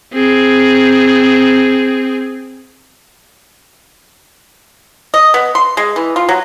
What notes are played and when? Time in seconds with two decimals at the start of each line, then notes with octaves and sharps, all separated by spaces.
0.13 C4 G#4
5.14 D#5
5.34 B3
5.55 C6
5.77 G#3
5.96 E3
6.16 F4
6.29 F#3